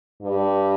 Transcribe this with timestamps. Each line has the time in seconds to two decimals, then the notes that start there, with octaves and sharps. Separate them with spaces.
0.23 G2